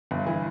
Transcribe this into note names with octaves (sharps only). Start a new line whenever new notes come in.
G1 G2
E3